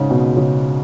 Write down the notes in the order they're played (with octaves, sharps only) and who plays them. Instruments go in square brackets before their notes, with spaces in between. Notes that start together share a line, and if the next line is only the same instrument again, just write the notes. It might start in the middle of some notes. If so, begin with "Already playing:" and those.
Already playing: [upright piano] G#2 C#3
B2
C#3